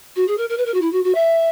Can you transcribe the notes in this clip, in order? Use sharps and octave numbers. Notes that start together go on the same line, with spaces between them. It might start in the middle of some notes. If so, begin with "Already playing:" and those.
F#4
G#4
A#4
A#4
B4
A#4
F#4
E4
F#4
F#4
E5